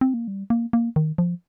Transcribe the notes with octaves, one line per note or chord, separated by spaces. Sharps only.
C4
A#3
G3
A#3
A#3
D#3
F3